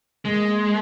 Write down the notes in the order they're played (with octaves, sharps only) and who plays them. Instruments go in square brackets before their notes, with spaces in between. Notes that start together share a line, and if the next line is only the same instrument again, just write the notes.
[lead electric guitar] G#3 [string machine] A#3